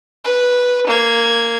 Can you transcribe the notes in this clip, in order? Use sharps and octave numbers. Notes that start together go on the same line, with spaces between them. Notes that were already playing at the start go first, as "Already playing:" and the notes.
B4
A#3 G#6